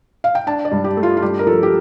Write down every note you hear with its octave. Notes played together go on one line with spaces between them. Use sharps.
F5
G5
D4 A5
D5
G2
G4
A3
F4
F4
G2 G4
A#4
F3 A4
G4